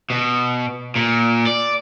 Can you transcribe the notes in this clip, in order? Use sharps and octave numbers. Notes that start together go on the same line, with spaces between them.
B2
A#2
D5